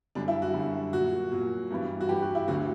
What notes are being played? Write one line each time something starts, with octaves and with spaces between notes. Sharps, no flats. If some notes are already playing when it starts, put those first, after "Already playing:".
F#2 D3 G3 D4
E4
F#4
F#2 D3 G3
A#2 F#3 F#4
A#2 F#3
G2 E3 G3
F#4
G2 E3 G3 G4
F#4
E4
D2 D3 F#3 F#4